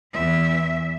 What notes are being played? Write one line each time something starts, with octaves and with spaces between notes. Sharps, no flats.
E2 E5